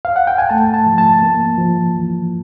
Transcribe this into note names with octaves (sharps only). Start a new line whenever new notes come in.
F5
F#5
G5
G#5
A3 A5
A5
F3
A5
A#3
F3
E3